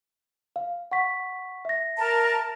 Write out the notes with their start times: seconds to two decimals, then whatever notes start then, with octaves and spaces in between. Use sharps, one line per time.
0.56 F5
0.91 F#5 C#6 B6
1.65 E5 A#6
1.97 A#4 A5